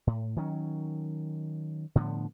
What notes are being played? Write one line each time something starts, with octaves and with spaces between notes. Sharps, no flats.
A2
D#3 F#3 A#3 C#4
A2 D3 F3 B3